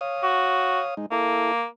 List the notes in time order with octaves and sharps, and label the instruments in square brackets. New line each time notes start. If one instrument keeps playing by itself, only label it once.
[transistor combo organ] C#5 F5 D#6
[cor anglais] F#4
[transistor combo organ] G#3 D#4
[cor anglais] A#3 [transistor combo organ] E4 A4